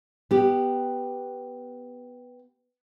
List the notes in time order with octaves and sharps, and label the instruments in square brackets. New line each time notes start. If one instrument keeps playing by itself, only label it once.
[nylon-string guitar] B3 G4